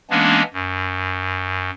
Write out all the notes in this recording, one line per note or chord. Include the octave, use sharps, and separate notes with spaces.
E3 G#3 A#3 B3 C#4 D4
F#2